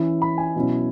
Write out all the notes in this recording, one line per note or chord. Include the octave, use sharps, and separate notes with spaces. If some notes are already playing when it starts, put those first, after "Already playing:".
Already playing: E3 C#4 E4 E5
B5
G#5
B2 F#3 C#4 E4